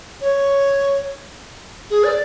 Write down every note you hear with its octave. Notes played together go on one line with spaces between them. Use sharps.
C#5
G#4
D5